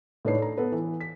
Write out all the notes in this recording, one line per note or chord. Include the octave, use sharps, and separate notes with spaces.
A2 D4 D#4 B4 C#5 C7
A4 A#5
B3 A4 B4
E3
B6